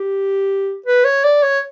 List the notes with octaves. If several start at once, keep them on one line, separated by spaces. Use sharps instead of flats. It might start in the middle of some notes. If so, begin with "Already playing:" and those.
Already playing: G4
B4
C#5
D5
C#5